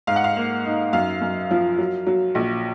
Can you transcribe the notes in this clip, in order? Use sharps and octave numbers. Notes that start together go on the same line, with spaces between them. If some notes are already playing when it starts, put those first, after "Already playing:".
G#2 F5
F#5
F5
A#3
D#4
F#2 F5
F#2
F3
F#3
F#3
A#1